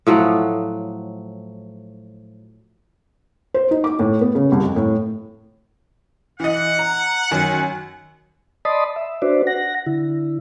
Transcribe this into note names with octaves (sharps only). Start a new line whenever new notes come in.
A2 F3 F#3 F#5
C5
D#4
D6
A2
B3
C#3
C2
F2
A2
E3 D#5 F#5
A#5
F#2 D#3
D5 D#5 A5 B5 C6 D#6
E5
D4 F#4 B4 C5 D5
F#5 A#6
D3 E4